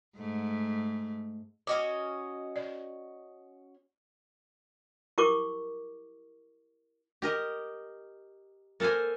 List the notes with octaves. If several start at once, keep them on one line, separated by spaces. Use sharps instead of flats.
G#2 A3
C#4 F#4 D#5 D6
D5
E4 G4 A#4 C#6 D6
G4 A#4 D#5
A#3 A4 A#4 C5 G#5